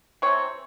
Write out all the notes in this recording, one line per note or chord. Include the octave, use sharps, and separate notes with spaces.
C3 E3 C4 C#5